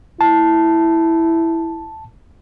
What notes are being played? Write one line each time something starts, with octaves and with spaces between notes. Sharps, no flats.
E4 A5